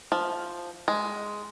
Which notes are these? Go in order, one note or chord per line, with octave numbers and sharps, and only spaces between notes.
F3
G#3